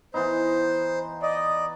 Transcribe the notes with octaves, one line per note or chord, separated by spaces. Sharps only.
E3 B3 D#4 C5
D5 D#5